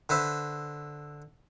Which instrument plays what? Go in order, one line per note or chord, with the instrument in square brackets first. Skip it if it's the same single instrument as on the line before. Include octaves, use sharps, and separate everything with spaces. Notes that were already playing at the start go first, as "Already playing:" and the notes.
[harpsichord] D3 B4 C5 E5